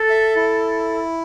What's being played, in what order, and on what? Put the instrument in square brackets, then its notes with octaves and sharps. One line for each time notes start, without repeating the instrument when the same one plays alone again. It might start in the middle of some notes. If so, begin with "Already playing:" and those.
Already playing: [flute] A4
[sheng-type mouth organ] E5
E4